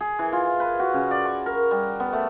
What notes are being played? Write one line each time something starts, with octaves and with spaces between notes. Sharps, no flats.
G#4
E3
F4
B4
F#4
C#3
D5
C#6
A#4
G3
B3
A3